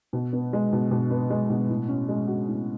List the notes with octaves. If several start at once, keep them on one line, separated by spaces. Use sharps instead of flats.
B2
B3
G#3
B2
B2
B3
G#3
B2
A2
C#4
G#3
F#4
A2